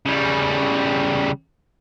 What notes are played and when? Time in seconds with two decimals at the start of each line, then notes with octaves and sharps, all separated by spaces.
0.06 C#3 G3